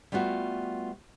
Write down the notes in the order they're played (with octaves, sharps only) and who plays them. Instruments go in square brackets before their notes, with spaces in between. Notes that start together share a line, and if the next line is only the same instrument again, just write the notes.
[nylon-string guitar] G3 A3 B3 F4 F#4